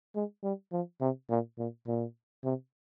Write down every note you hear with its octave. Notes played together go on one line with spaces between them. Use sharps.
G#3
G3
F3
C3
A#2
A#2
A#2
C3